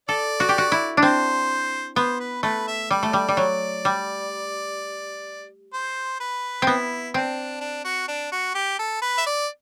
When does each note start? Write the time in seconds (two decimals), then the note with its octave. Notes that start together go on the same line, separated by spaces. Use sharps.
0.09 A4 D5
0.40 F#4
0.49 G4
0.58 F#4
0.72 E4
0.97 D4
1.02 C4 C5
1.96 B3 C5
2.20 B4
2.43 A3 B4
2.68 E5
2.90 G3 D5
3.03 A3
3.13 G3
3.29 G3
3.37 F#3
3.85 G3
5.73 C5
6.20 B4
6.62 B3 C4 E4
7.14 C4 D4
7.61 D4
7.85 F#4
8.08 D4
8.32 F#4
8.55 G4
8.79 A4
9.02 B4
9.18 E5
9.26 D5